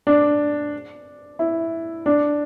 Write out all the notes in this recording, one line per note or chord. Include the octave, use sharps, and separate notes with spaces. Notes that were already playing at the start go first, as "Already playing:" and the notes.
D4
E4
D4